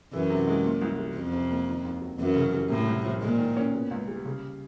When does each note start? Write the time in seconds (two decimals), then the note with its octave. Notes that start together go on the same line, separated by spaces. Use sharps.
0.13 F#2 E3
0.30 C3
0.47 G#3
0.65 A#2
0.82 C2
0.99 G3
1.16 F2 F3
1.33 C3
1.50 A#3
1.67 D#3
1.85 D#2
2.01 F#3
2.19 F#2 E3
2.36 C#3
2.53 G3
2.70 A2 C3
2.87 C2
3.05 F3
3.22 A#2 G#3
3.39 D#3
3.57 C#4
3.73 B2
3.91 C#2
4.08 G3
4.25 C#3